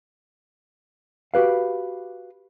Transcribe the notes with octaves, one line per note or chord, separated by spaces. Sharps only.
F#4 G4 B4 F5